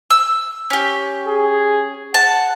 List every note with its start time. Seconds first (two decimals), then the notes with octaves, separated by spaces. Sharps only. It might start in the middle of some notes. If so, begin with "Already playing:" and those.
0.10 E6
0.70 C#4 G4
1.27 G#4
2.14 F#5 A5